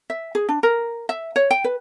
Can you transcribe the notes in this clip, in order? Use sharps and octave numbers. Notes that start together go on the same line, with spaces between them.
E5
G#4
D4
A#4
E5
C#5
G5
B4